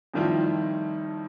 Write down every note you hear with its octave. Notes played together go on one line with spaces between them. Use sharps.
F2 A2 D#3 G3 E4 F4